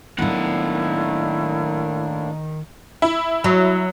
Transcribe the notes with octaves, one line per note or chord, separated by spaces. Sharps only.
A2 D#3 F#3 A#3 B3 D4 E4 F#5
E4
F#3